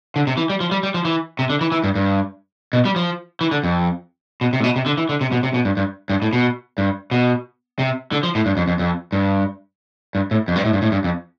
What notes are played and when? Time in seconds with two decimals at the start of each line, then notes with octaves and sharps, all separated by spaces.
0.16 D3
0.27 C3
0.37 E3
0.50 G3
0.60 F3
0.72 G3
0.83 G3
0.94 F3
1.05 E3
1.39 C3
1.50 D3
1.61 E3
1.72 E3
1.84 G2
1.95 G2
2.73 B2
2.85 G3
2.96 F3
3.41 E3
3.51 D3
3.64 F2
4.41 B2
4.53 C3
4.60 A2
4.64 B2
4.76 C3
4.86 D3
4.97 E3
5.09 D3
5.21 C3
5.32 B2
5.43 C3
5.54 B2
5.65 G2
5.77 G2
6.10 G2
6.22 A2
6.33 B2
6.78 G2
7.11 B2
7.79 C3
8.12 D3
8.23 F3
8.35 A2
8.46 G2
8.57 F2
8.68 F2
8.79 F2
9.12 G2
10.15 G2
10.31 A2
10.48 F2
10.56 G2
10.65 A2
10.73 G2
10.82 A2
10.92 G2
11.04 F2